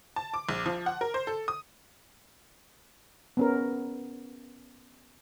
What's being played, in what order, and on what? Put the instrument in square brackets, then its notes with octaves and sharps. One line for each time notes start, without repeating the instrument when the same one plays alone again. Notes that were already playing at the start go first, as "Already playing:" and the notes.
[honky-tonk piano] A5
D6
A#1
F3
F#5
A#4
C5
A4
D#6
[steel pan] B3 C#4 A#4